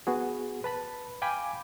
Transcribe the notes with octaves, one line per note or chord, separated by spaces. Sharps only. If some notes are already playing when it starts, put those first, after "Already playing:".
B3 F#4 G#4
B4 A5 B5
F5 G5 G#5 B5 D6